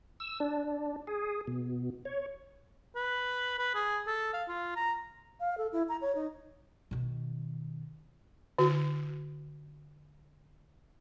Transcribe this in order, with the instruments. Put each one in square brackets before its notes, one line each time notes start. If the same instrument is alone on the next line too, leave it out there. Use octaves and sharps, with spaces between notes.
[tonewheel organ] E6
D4
G#4
B2
C#5
[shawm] B4
B4
G#4
A4
F5
F4
A#5
[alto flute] F5
A4
E4
A#5
C#5
D#4
[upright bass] B2 D#3
[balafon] D3 F#4